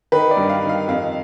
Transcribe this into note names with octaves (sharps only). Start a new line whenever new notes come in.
D#3 B4
D5
G2
F5
D#3
F5
F2 F5